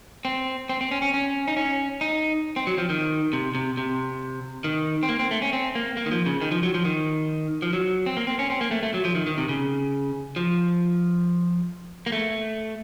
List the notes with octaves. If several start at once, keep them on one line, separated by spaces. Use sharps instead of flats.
C4
C4
C4
C#4
C#4
C#4
D#4
C#4
D#4
C4
F#3
F3
D#3
C3
C3
C3
D#3
C4
A#3
C4
A3
C#4
C4
A#3
A#3
D#3
F3
C#3
D#3
F3
F#3
F3
D#3
F3
F#3
C4
A#3
C4
C#4
C4
A#3
A3
A3
F#3
F3
D#3
D#3
C3
C#3
F3
A#3
A3